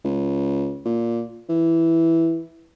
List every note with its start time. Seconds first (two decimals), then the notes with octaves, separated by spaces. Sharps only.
0.05 C#2
0.85 A#2
1.49 E3